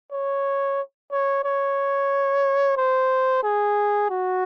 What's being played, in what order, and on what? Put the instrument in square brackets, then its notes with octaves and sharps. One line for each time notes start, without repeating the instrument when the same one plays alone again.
[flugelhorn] C#5
C#5
C#5
C5
G#4
F#4